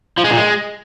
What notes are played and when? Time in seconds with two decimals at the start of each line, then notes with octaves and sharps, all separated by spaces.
0.18 F3
0.24 G#3
0.31 A#2
0.37 G#3